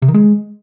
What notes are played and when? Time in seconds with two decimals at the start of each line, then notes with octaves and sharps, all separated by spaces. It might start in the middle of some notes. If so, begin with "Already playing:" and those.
0.02 C3
0.08 D#3
0.14 G#3